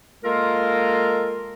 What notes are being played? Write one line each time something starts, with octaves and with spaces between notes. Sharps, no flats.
G#3 A#3 F4 A4 A#4